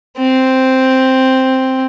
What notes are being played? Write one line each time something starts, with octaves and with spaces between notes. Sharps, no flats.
C4